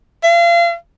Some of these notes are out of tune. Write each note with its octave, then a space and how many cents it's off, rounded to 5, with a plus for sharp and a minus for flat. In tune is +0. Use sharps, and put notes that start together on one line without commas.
F5 -35